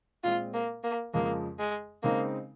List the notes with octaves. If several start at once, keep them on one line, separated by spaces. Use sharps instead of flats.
A#2 G#3 C4 F4
A#3
A#3
F2 C#3 F3 G#3 A#3
G#3
C#3 G#3 A#3 C4 D#4